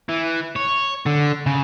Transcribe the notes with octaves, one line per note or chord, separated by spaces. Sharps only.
E3
C#5
D3
C#3